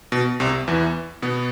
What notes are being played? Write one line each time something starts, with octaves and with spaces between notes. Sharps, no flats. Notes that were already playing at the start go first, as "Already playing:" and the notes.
B2
C2 C3
E2 E3
B2 B3